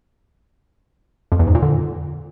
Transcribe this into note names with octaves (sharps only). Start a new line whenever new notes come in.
F2
E2
G#2
A#2
D3